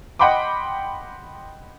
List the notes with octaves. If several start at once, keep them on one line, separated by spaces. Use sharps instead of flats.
D#5 F#5 G5 B5 C6 D6